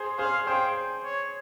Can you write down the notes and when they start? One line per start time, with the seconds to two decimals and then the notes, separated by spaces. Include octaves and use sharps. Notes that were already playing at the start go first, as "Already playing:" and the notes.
Already playing: G#4 C5
0.19 G#4 C5 F5
0.47 G#4 C5 G5
1.04 C#5